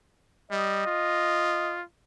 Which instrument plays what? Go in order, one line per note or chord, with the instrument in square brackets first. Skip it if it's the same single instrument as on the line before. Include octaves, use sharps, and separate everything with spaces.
[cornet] G3 [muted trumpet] D#5
[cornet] F4